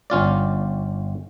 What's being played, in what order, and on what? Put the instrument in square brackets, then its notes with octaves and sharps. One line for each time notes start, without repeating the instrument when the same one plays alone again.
[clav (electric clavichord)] G1 C#4 F4 D5